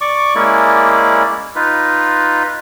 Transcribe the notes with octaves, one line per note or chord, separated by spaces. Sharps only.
D5 C#6 D6
G#3 A#3 C#4 E4 D5
D#4 F4 B4